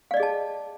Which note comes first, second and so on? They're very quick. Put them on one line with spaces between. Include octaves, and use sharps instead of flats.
F5 D5 D#5 G#4 A5